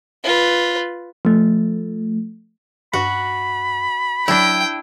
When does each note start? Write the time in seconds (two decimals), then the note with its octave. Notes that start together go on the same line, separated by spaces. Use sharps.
0.24 F4 B4
1.25 F3 A3
2.93 G2 F#4 B5
4.28 F#3 D4 E4 G5